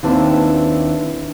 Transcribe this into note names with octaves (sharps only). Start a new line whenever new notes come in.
D#2 C4 D4 E4 B4 A5